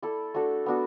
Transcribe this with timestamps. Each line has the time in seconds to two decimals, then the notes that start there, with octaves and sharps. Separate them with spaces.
0.03 E4 A4 D5
0.34 A3 D4 F#4 A4
0.66 B3 D4 F#4